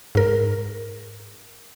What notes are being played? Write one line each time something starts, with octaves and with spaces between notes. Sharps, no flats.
G#2 A#4